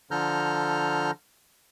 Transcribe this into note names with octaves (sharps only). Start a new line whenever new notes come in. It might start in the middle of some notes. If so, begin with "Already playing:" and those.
D3 F3 A4 A#5 F6 G6